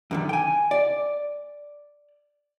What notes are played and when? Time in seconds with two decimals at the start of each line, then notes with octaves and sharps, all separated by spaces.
0.11 F#2 D3 D#3
0.29 G5 G#5
0.71 D5